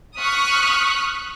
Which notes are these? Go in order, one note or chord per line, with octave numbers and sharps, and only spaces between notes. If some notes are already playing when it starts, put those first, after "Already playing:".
C#6 D#6 F6 F#6 B6